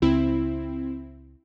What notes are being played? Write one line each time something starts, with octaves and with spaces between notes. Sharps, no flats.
C#2 C4 E4